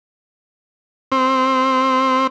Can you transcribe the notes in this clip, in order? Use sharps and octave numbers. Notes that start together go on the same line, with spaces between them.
C4